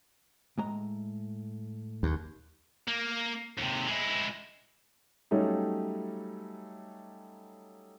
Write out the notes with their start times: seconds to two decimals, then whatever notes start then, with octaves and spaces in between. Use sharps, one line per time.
0.58 A2 G#3 A#5
2.03 D#2
2.88 A#3
3.58 D#2 C3
3.87 G#3 E4
5.31 F#3 G3 A3 C#4 D#4